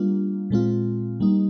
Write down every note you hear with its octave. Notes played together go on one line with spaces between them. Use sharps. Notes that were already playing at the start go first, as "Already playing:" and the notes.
Already playing: G3 A#3 D4 F4
A#2 G#3 C4 F4
G3 A#3 D#4